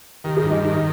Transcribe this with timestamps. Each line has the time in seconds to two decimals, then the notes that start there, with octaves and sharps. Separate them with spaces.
0.24 D#3 G4
0.37 G#4
0.43 G2
0.50 D#4
0.63 D#3